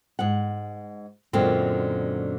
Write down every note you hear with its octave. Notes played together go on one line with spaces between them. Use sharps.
G#2 F#5
F#2 A#2 D3 G#3 C4